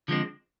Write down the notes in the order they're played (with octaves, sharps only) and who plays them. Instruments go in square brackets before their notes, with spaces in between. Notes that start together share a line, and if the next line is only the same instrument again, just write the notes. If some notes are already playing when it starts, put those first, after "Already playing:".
[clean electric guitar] D3 F3 G#3 C4